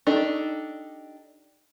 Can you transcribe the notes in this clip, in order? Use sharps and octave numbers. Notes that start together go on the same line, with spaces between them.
D4 D#4 G4 A4